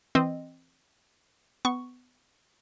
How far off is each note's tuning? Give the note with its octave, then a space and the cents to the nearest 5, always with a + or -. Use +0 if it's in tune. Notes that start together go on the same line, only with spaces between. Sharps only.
E3 +0 C4 +0 D#5 -15
B3 +20 C#6 +0